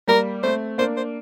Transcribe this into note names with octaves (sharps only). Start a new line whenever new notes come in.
G3 A#3 A#4
A3 C4 C5
A#3 D4 C5
C5